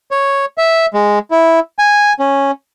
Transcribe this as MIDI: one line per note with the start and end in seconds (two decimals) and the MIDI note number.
0.11 0.45 73
0.58 0.86 76
0.94 1.19 56
1.31 1.60 64
1.79 2.13 80
2.19 2.51 61